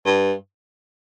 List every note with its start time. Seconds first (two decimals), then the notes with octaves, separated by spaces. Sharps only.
0.06 G2